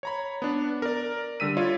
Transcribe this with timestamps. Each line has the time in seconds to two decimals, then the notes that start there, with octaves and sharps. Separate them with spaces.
0.03 C#5 A#5 B5
0.42 B3 D4
0.82 A#4 D5
1.40 D3 G3 E6 B6 D#7
1.57 E4 F4 C#5 D5